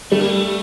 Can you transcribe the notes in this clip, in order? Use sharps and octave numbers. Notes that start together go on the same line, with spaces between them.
G3 A3
A#3
A3